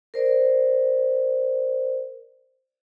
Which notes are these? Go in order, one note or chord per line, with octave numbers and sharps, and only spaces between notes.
A#4 C5 D5